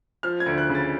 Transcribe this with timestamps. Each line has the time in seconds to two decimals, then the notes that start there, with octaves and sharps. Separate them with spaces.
0.23 F3 F6
0.40 G#6
0.46 D2
0.58 F#6
0.69 C#3
0.75 A6